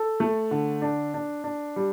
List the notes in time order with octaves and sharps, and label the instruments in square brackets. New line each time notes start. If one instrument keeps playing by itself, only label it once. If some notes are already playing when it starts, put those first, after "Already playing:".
Already playing: [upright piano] A4
A3
D3
D4
D4
D4
G3